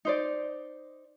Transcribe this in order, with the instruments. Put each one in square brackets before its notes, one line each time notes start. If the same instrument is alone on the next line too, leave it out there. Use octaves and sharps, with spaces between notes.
[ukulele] D#4 C5 D5